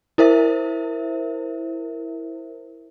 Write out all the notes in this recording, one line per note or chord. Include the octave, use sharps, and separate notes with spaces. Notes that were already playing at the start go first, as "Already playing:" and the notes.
E4 A#4 C5 E5